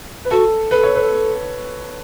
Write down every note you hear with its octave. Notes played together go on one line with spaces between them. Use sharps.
B4
F#4 A4
A4 B4
C#5
B4